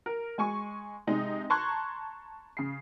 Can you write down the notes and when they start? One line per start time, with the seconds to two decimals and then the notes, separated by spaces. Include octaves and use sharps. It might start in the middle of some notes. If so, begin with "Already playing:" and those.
0.06 A#4
0.38 G#3 G#5 C#6
1.07 C3 G#3 D#4
1.50 A5 A#5 C6 C#6 F#6 G#6
2.57 C#3 C7